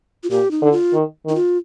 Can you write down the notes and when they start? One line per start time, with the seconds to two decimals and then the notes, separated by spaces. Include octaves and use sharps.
0.24 F4
0.30 A#2 G4
0.51 D#4
0.62 D3
0.72 F4
0.93 D#3
1.25 D#3 D#4
1.36 F4